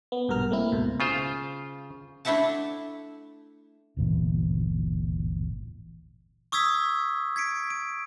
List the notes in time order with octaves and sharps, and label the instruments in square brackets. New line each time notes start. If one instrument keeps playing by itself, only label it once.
[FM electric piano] B3
A#1 G2 B2 A#4 F6
A3 A#3 C4 E4
C#2 G#2 B2
[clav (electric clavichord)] C#3 F4 C5
[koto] A3 D4 E4 E5 F#5 A5
[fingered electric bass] D1 G1 A#2 E3
[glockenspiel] C#6 D#6 E6 G#6 B6
G#6 B6 C#7 D7
D7